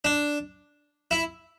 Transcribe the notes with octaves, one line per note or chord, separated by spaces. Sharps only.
D4
E4